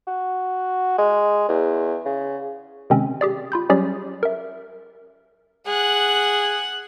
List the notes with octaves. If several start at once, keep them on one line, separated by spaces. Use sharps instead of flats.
F#4
G#3
E2
C#3
C3 D#3 G#3 C4 C#4
G4 G#4 D5
F4 B5 G6
F#3 G3 C#4 G4 G#4 D5
A#4 E5
G#4 F#5 F#6